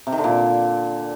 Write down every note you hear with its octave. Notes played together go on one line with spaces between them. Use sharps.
C3
D#3
D3
A#2